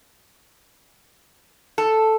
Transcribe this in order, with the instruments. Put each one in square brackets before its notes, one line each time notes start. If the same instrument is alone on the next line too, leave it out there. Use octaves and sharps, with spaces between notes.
[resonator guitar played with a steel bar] A4